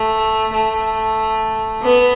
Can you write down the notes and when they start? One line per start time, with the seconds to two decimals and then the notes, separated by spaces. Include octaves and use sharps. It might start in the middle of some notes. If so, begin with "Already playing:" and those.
Already playing: A3
0.53 A3
1.83 B3